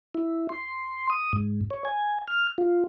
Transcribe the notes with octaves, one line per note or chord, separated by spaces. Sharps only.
E4
C6
D#6
G#2
C#5
G#5
F6
F4